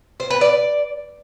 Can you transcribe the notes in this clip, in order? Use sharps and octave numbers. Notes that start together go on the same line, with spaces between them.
C5
B4
D5